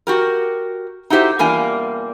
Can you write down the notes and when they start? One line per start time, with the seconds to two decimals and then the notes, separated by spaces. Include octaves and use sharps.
0.07 F#4 G4 A#4
1.10 D#4 E4 F#4 G4 C5
1.39 E2 G3 A#3 D4 F4 G#5